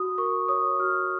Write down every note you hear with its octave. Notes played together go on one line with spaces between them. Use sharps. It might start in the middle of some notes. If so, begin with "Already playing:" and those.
Already playing: F#4 D#6
A#4 C#6
C#5 D#6
F#4 F6